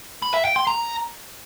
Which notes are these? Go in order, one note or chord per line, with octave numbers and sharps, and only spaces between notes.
B5
E5
G5
C6
A#5